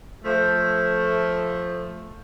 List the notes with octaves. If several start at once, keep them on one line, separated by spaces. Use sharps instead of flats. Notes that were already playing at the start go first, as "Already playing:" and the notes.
F3 A3